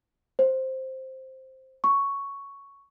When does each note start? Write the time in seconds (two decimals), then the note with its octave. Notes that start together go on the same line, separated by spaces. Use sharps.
0.39 C5
1.84 C#6